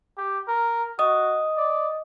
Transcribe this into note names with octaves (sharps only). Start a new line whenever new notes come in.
G4
A#4
F#4 D#5 D#6
D5